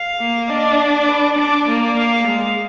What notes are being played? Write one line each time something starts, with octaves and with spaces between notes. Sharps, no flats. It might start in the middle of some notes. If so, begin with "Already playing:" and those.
Already playing: F5
A#3
D4 D#5
D5
B4
D4 D5
A#3
F5
G#3